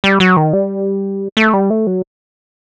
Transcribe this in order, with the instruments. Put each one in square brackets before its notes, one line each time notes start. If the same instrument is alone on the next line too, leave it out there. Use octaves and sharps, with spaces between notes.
[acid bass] G3
F#3
D#3
G3
A3
G3
A3
F#3